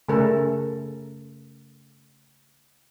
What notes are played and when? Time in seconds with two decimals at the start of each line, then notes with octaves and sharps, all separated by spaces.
0.08 C#3 A3 A4 A#4